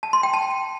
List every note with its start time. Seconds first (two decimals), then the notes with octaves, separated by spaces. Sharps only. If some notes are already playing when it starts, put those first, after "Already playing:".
0.03 A5
0.13 C6
0.23 G5
0.33 A5